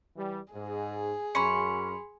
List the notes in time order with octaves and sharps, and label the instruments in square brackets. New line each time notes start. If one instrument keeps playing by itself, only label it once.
[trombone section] E3 G3
[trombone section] G#2 [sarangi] G#4
[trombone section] F#2 [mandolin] C#4 [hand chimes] B5 C6 C#7